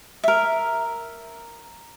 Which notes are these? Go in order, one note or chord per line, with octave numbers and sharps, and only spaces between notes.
A#4 E5